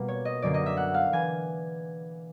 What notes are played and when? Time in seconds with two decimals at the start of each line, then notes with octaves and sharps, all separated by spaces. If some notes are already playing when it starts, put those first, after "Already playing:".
Already playing: B2 G3 A#3
0.08 C#5
0.25 D#5
0.42 F#2 D3 F#3 A#3 D5
0.54 D#5
0.66 E5
0.77 F#5
0.94 F5
1.12 E3 G#5